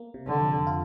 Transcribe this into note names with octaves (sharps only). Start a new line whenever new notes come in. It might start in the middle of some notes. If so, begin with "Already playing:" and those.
Already playing: A#3
C3
D3
F2
F4